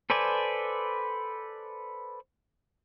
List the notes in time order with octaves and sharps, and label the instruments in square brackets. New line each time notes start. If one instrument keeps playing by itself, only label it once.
[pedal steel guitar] A4 B4 C5 D5 G#5